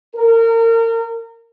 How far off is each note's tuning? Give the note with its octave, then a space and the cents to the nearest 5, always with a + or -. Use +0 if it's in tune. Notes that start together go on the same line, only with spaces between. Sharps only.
A#4 -30